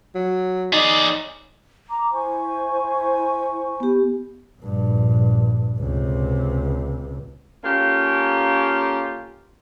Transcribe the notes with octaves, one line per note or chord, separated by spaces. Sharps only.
F#3
D#4 G#4 D5
A#5 D6
E4 C5 G#5 C#6
B3 G4
A#1 G2
C#2 C3
A#3 C#4 F4 G4 A4 A#4